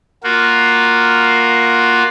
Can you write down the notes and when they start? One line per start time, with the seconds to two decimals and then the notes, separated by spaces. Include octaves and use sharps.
0.23 A#3 F4 F#4